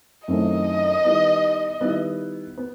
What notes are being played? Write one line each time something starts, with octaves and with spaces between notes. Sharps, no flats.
F#2 D#3 A3 C4 E4 D#5
D#3 G3 B3 E4
D#3 G3 B3 E4
B3